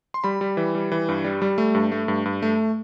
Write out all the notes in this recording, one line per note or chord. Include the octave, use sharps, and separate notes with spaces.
C6
G3 B5
G3
E3
G3
E3
G2
G3
G3
A3
G2
A3
G2
G2
A3